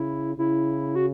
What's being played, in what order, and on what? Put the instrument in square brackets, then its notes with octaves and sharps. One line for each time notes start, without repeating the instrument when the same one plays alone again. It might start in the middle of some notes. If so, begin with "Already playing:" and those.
Already playing: [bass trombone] C#3 [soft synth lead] E4
[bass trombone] C#3 [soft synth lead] E4
[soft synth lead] F#4